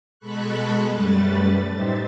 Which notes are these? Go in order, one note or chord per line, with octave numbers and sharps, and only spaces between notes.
B2 G#3 A4 B5 C#6 F#6
F#2 G3 A3 B4 A6
A2 D#4 G4 C5 E5 A6